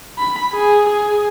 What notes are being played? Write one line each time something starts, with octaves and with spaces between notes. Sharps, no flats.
B5
G#4
G#4